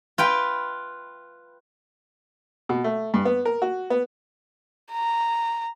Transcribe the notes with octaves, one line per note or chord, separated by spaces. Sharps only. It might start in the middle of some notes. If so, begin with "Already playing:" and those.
F4 B4 G5
B2
A3
G2
B3
A#4
F#4
B3
A#5